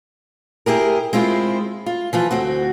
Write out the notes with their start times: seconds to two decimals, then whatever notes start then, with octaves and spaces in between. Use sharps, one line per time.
0.66 E4 G4 G#4 A#4
1.13 G#3 C4 E4 F4
1.86 F4
2.13 E3 F3 F4
2.31 D2 C4 F#4